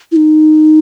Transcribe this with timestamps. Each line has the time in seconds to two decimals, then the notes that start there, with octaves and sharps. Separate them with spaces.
0.12 E4
0.16 D#4